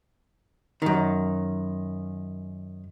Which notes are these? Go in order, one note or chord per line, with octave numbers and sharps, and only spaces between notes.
F#2 D#3